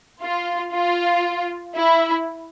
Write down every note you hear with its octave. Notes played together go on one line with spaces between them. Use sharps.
F4
F4
E4